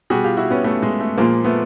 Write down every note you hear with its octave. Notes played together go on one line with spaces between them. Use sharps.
B2 G3 F#4 G#4
F4 G4
E4 F#4
B3 C#4
A3 B3
G#3
A3
A#2 F3 G#3 A#3
A3 B3